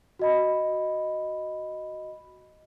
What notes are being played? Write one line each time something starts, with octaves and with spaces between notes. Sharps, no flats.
F#4 D#5 B5